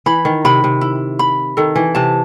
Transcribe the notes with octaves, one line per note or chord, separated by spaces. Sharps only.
E3 B5
D#3
C3 B5
C3
E4
B5
D#3 A4
E3
C3 A5